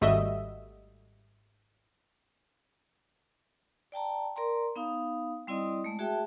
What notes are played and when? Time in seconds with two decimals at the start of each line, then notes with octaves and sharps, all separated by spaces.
0.01 G#1 G3 A3 F#4 D#5 E5
3.92 D5 G5 A5 A#5
4.36 A#4 D5 A#5 C6
4.76 B3 D#4 F5 D#6
5.47 G3 C4 E4 D5 D#5 D#6
5.84 G#3 A3
5.99 F#4 G#4 E5 G5 A5